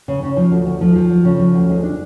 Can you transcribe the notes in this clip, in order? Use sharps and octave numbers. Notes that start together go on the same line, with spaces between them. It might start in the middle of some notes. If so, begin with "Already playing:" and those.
C#3
C#3
F3
D2
D2
F3
F3
D2
C#3
F3
D2
G#3
D4